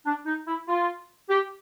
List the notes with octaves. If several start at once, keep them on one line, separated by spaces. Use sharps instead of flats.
D4
D#4
E4
F4
G4